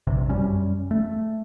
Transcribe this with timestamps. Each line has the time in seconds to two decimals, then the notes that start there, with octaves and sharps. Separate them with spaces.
0.07 A#1 G2 C3
0.29 F#2 G3 C#4
0.91 A3